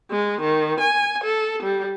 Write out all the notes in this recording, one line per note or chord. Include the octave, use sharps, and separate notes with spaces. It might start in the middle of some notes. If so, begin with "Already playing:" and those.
G#3
D#3
G#5
A4
G3